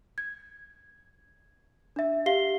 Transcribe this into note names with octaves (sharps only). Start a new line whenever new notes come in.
G#6
D4 E5
G4 F5 C7 G7